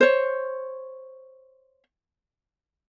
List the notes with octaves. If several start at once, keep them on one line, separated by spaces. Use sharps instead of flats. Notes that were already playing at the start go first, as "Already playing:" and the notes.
C5 C#5